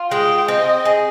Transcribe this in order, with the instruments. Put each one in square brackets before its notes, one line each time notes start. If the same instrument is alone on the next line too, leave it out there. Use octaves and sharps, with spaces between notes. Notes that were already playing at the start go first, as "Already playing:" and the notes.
Already playing: [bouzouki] F4
[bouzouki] G#3 [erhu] G5
[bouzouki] C4 [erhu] D#5
[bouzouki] G#4